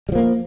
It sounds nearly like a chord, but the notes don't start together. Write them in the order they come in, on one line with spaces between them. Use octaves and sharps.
G3 F3 A#3